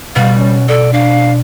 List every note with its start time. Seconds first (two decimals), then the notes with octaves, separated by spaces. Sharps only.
0.16 B2 G3 F5
0.38 C#4
0.69 A4 D5
0.93 D4 F5